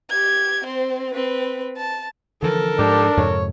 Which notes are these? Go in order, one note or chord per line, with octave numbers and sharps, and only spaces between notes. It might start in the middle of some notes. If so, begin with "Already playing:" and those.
G4 G#6
C4 C5
C4 B4
A5
D3 E3 F3 A4 A#4
G#2 F3 D4 G4
F2 G#2 C3 C#5